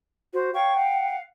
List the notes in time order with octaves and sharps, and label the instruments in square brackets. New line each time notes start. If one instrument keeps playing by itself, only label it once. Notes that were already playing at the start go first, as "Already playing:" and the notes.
[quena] F#4 [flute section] C5
[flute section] C#5 F5 C#6 [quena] G5
[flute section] F5 F#5